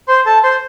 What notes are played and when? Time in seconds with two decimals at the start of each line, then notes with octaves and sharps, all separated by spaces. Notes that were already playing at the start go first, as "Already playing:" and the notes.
0.08 C5 C6
0.26 A4 A5
0.44 C5 C6